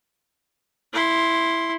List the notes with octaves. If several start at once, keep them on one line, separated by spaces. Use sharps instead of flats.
E4 C6